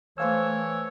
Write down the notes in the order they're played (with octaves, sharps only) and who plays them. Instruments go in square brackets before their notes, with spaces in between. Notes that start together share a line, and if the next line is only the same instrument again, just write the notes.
[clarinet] E3 [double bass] A3 [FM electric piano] C5 F5 E6 [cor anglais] C#5